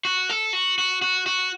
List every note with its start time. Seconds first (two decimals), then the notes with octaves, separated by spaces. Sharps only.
0.05 F#4
0.29 A4
0.53 F#4
0.78 F#4
1.02 F#4
1.26 F#4